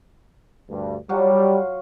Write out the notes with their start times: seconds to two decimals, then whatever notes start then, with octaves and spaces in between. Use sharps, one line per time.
0.69 D2 G2
1.09 F#3 G3 F4 F#4